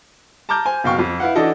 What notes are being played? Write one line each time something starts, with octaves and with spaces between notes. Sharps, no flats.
A5 A#5 D6 F6 G6
C5 G#5
F#1 B2 F5 G5 C#6
F2 F5
E4 B4 F5 F#5
E3 D4 D#4 F#4 A4 D#5